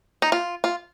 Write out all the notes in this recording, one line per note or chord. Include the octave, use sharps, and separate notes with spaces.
D#4
F4
F4